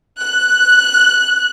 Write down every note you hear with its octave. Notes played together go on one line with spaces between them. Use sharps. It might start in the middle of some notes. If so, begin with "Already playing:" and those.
F#6